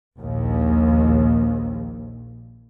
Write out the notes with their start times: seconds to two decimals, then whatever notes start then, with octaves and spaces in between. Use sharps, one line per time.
0.19 A#1 D#2